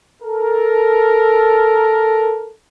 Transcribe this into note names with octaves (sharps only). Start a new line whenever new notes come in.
A4 A#4